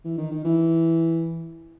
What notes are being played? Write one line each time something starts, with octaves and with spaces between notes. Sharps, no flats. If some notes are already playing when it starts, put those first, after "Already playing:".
E3
D#3
D#3
E3